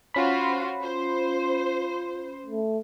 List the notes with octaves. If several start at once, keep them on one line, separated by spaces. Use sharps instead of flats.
C#4 F4 F#4 C5 B5
F4 C5
A3